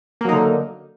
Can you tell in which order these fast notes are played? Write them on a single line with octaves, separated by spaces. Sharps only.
A#3 F#3 D#4 D3